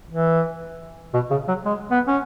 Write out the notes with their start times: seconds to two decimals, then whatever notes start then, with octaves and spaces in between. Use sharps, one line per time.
0.10 E3
1.14 B2
1.31 C#3
1.48 F#3
1.65 G#3
1.91 B3
2.08 C#4